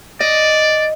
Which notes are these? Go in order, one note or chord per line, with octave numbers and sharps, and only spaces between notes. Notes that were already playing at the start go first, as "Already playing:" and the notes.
D5 D#5